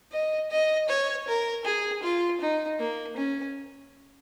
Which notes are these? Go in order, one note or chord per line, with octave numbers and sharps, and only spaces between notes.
D#5
D#5
C#5
A#4
G#4
F4
D#4
A#3
C#4